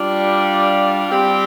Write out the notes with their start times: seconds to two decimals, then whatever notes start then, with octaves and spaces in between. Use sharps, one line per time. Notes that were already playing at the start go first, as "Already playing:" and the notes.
Already playing: G3 D4 F4
1.09 G3 C4 G4